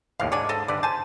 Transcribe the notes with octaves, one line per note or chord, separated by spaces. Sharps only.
D#2 A2 E3 F5
G#2 D4 C#5 D5 G#5
A4 D#5
G2 D3 B4 D5
C5 G#5 A5